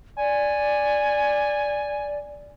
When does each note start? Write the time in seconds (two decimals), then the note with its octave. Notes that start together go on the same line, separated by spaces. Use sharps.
0.18 D5 G#5